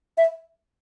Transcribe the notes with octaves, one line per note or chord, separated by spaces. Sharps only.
E5